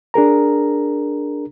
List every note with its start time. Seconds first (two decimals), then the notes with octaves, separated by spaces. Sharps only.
0.14 D4 G#4 A#4 A#5